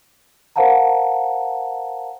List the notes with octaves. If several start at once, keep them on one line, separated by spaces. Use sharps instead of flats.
A#4 C5 F5 F#5 A5 A#5